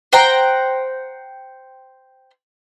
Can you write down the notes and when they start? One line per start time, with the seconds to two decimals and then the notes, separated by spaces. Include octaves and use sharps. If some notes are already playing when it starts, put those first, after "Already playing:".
0.13 C5 F#5 G5 A#5